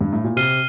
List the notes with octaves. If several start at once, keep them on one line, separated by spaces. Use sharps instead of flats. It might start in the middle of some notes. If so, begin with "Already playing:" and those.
G2
A2
A#2
C3 F6 C7 D#7 G7